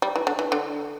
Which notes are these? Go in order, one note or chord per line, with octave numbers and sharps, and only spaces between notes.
G3
E3
D3
E3
D3